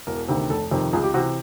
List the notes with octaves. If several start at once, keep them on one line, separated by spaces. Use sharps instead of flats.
E1 A#4
D2 C3 D#3
F1 A4
F2 C3 D#3
C#2 G#4
G4
C3 E3 F#4